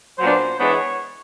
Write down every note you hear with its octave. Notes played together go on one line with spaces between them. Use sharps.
A#2 F#3 B3 D4 C5
E3 G#3 B3 D4 C#5